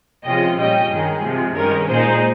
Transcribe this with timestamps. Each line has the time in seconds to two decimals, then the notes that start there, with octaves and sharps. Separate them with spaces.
0.25 C3 F3 G#3 C#4 F4 D#5 G5
0.58 A#2 G3 C#4 D#5 G5
0.90 G2 D#3 G#3 G#4
1.23 C3 F3 G#3
1.56 G2 D#3 G#3 C#4 A#4
1.89 A#2 G#3 D#4 G#4 C5